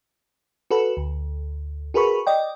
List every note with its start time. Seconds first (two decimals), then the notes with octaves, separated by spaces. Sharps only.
0.71 F#4 A4 B4
0.97 D2
1.94 F#4 G#4 A#4 B4 B5 C#6
2.27 D5 D#5 G5